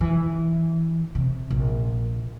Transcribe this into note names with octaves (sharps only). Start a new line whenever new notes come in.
E3
C3
A#1